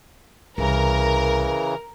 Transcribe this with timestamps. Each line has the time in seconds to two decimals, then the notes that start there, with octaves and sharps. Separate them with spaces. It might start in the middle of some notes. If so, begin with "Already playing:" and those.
0.58 C2 C#3 E3 A#4